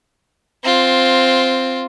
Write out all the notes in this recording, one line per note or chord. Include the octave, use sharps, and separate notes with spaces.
C4 F4